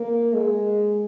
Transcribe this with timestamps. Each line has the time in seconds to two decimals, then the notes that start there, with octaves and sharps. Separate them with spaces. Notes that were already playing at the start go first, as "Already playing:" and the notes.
Already playing: A#3
0.34 G#3